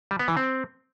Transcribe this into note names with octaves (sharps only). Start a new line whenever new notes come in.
G3
B3
E3
C4